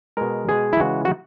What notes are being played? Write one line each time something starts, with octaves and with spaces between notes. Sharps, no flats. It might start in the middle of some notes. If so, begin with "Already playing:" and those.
B2 G#3 A#4
B2 G#3 G#4
E4
C#3 E3 G#3 F#4
F#4